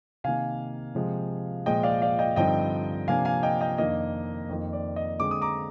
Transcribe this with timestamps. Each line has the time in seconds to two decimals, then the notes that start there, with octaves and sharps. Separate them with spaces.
0.24 C3 D#3 A#3 F5 G#5
0.95 C3 F3 G#3
1.66 A#2 F3 G#3 D#5 G5
1.83 D5 F5
2.02 D5 F5
2.19 D#5 G5
2.36 G2 D3 F3 C4 D#4 D#5 G5
3.08 C3 F3 A#3 D4 F5 G#5
3.25 F5 G#5
3.43 D#5 G5
3.61 D#5 G5
3.78 F2 D#3 A#3 D4 D#5
4.49 F2 D#3 A#3
4.73 D5
4.96 D#5
5.19 D3 G#3 C4 D6
5.31 D#6
5.42 A#5 D6